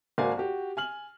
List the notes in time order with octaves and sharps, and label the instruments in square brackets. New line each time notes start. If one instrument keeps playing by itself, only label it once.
[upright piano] G#1 A#3 F#4 D5 F5 G#5
F#4 G4
G#5 F6 F#7